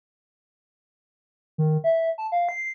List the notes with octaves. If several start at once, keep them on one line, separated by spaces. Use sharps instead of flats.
D#3
E5
A5
F5
C7